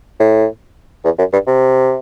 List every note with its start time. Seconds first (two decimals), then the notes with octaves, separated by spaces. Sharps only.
0.20 A2
1.05 E2
1.19 F#2
1.33 G2
1.47 C3